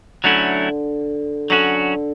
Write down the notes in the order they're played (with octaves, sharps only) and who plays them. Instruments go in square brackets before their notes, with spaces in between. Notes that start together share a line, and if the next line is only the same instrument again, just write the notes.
[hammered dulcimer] D3 [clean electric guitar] F#3 A3 C#4 E4
[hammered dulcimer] D3 [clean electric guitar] F#3 C#4 F#4